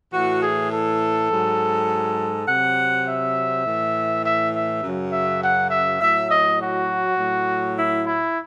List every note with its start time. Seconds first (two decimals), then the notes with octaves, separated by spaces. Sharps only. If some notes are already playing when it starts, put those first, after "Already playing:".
0.13 A2 E3 F#4
0.43 G#4
0.73 A4
1.31 G#2 F#3
2.48 C3 F#3 F#5
3.07 E5
3.66 A2 E3
4.25 E5
4.54 E5
4.83 F#2 C#3 F#3
5.12 E5
5.42 F#5
5.71 E5
6.01 A2 F#3 E5
6.30 D#5
6.60 F#4
7.18 A2 F#3
7.77 E4
8.07 E4